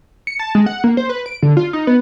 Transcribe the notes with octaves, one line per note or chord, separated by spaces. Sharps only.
C#7
A5
G#3
F#5
A#3
C5
B4
D7
D3
F4
D#4
B3